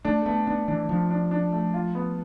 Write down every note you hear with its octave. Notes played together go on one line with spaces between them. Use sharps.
A3 D4
A3 B3
B3 D4
E3 D4
F3 D4
D4
D4
A3
F4
B3